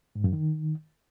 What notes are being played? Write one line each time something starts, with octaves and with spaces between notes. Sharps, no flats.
G#2
F#2
D#3